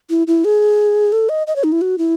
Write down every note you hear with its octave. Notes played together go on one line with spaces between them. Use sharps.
E4
E4
G#4
A4
D#5
D#5
C#5
D#4
E4
F#4
E4